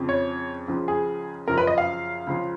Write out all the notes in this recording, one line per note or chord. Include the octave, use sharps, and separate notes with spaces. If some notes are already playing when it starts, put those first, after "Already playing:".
Already playing: F2 C#3 F3
C#5
C#2 C#3 F3
G#4
F#2 C#3 F3 A#4
B4
D#5
F5
C#2 C#3 F3